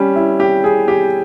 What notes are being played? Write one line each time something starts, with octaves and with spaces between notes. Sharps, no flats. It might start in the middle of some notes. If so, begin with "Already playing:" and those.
Already playing: G3 C#4
E4
G4
G#4
G4